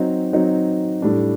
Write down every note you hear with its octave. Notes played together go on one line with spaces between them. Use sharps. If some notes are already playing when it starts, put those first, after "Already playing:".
Already playing: F#3 C4 D#4
F#3 C4 D#4
A2 G3 D4